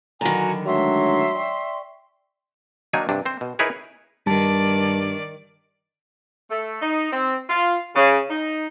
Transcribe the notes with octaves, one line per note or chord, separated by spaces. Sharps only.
D3 D#3 F#3 F#4 G#5 A#5 B5
F#3 G#3 A3 D4 E5 C6
D5 G5 C#6
D#3 F#3 A#3 D4 D#4 G#5
G2 C3 D4
C4 C5
B2
D#4 E4 G#4 A#4 B4 C#5
G2 D#3 G3 D5 A5
A3
D#4
C4
F4
C#3
D#4